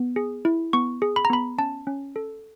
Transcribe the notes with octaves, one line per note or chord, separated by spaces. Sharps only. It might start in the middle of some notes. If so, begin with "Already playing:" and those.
Already playing: B3
G#4
E4
B3 C#6
G#4
B5
A#5
B3 B5
C#4 A5
C#4
A4